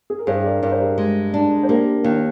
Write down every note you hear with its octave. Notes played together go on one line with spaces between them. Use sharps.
G#4
A#4
G2 G#4 C5
A#4 D5
G2 A#4 D5
C5
G4 A#4
G#3
D4
C5
A#3 G4 A#4
D#2